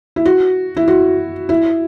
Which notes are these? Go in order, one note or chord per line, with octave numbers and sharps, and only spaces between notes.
E4
F#4
E4
F#4
E4